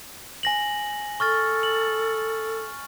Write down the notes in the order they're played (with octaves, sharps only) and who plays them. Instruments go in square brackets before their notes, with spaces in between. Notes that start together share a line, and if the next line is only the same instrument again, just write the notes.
[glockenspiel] G#5 A#6 F#7
[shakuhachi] A4 [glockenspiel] C#6 F6 A6
[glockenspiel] F#7